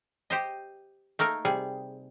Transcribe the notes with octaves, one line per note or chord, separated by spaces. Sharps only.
G4 C5 D#5
A3 A#3 D#4 A#4
C3 G3 G#4